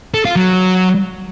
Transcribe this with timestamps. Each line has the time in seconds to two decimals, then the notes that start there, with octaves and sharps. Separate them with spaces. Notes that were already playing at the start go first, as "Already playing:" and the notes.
0.14 A4
0.25 F4
0.36 F#3